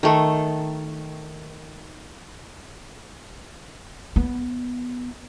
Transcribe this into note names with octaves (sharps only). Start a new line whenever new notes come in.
D#3 A3
B3